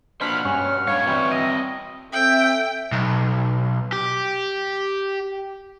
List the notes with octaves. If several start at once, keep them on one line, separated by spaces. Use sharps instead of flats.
B2 A#3 D4 C5 F#5 B5 F6
G2 C#4
A3 D4 C#5 F5
E3 G3 C4 F#4 G5
D#5
C4 A4 E5 G5
B1
G4